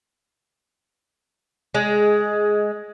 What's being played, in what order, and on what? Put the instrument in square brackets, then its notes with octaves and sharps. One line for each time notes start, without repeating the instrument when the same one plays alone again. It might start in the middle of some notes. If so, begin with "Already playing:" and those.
[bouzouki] G#3